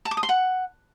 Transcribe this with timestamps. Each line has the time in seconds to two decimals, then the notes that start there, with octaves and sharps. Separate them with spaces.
0.05 A5
0.11 D6
0.17 D#6
0.23 C6
0.29 F#5